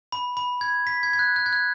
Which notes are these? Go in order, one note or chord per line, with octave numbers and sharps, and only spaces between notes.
B5
B5
G#6
B6
G#6
G#6
F#6
F#6
G#6
F#6